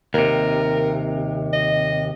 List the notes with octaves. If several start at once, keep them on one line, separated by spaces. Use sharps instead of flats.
D#2 C3 A#4
D#5